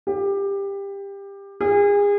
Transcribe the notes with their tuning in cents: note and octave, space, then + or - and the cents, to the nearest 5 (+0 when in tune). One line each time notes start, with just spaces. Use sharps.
G4 +20
G#4 -35